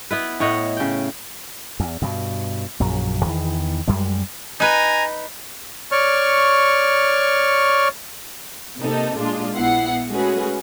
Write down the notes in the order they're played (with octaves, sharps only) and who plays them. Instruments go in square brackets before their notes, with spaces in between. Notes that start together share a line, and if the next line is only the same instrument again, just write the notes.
[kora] B3 E4 B4
A2 C#5 D#5 F#5
C#3 G5
[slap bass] E2
G2 B2
A#1 F#2 F#3
E2 D#3 E3
F#2 G3 G#3
[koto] D#4 B4 [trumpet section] G#5 A#5
[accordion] C#5 D5 C#6 F6
[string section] C3 A#3 D#4 A4
A#2 G#3 D4 F4
A#1 B3 E4 F#5 C7
G#3 A3 C#4 F#4 G#4 B4